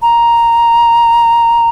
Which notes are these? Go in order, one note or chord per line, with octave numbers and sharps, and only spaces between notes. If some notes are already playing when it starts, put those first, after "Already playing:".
A#5